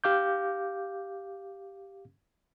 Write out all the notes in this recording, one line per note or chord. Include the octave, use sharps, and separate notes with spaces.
G4 F5 D6 G6